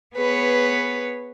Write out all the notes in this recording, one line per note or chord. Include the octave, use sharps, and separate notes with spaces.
B3 G#4 B4 C#5